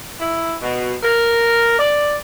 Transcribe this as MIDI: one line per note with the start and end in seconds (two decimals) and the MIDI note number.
0.19 0.55 64
0.62 0.94 47
1.03 1.78 70
1.79 2.15 74